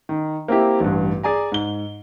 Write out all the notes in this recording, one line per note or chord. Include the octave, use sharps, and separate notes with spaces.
D#3
A#3 C4 E4 G4
A1 G2
G#4 D5 G#5 A#5
G#2 G7